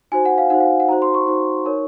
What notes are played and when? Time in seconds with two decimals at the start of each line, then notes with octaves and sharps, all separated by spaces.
0.12 D#4 F#4 C5 G#5
0.25 F#5
0.38 F5
0.50 D#4 F#4 C5 F#5
0.60 F5
0.80 F#5
0.88 D#4 F#4 C5 A#5
1.02 C6
1.14 C#6
1.27 D#4 F#4 C5
1.65 D#4 A#4 C#5